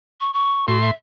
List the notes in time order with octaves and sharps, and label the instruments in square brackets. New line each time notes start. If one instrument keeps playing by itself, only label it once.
[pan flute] C#6
C#6
[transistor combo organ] A2 C6 [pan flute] F#4
[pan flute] E5